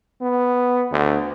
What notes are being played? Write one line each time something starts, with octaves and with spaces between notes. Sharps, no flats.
B3
D2